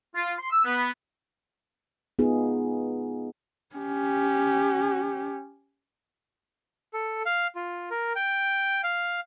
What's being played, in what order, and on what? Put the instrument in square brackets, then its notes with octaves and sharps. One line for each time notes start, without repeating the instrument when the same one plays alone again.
[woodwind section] F4
C6
E6
B3
[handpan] B3 D#4 F4 G#4
[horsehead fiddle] C#4 G4
[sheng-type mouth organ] A4
F5
F4
A#4
G5
F5